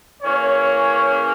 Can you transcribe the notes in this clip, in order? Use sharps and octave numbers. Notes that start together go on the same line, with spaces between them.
C#3 E3 A#3 C#4 C#5